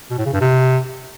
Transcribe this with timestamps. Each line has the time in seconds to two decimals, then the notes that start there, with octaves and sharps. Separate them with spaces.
0.11 B2
0.18 A2
0.26 C#3
0.33 G2
0.41 C3